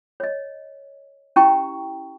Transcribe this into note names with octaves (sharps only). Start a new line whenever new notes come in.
C#5 D#5
C#4 E4 G4 G5 A#5 C#6